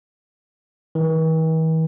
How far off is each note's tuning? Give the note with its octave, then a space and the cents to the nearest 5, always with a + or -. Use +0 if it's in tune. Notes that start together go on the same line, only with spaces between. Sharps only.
E3 -45